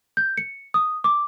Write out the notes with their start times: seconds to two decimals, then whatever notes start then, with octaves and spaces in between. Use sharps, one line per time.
0.17 G6
0.37 C#7
0.74 D#6
1.04 D6